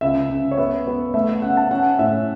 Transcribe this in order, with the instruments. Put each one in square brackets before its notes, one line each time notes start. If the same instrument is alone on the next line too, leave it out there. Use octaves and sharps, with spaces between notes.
[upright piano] C#2 [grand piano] E5
[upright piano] C#2
[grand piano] C#5
[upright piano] B3 [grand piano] E5
[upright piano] B3
[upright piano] A3 [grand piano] E5
[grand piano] E5
[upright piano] C#3 [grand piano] F#5
[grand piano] A5
[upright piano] C#4 [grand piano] F#5
[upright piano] A2 [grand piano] E5